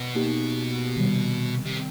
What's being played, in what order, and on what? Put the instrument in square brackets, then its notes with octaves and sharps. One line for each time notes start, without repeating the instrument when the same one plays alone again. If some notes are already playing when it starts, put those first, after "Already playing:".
Already playing: [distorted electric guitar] B2
[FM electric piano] A#3 D#4 G4
C3 D#3 G3
[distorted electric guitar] C3